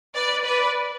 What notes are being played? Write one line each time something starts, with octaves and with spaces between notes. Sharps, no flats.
B4 D5
B4 D5